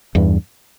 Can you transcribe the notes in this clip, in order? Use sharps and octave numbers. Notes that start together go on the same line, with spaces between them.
E2 G2